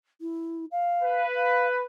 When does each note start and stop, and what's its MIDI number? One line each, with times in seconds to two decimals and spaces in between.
0.21 0.65 64
0.71 1.25 77
1.03 1.83 71
1.36 1.66 77